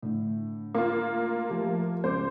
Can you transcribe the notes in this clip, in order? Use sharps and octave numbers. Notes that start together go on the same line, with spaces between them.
A2 D3
A#3 F4
F3 A3 G4
C#2 C5 D6